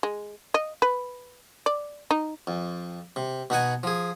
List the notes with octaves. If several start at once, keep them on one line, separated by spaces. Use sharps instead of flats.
G#3
D#5
B4
D5
D#4
F2
C3
B2 D#4 F#5 G#5
F3 G#4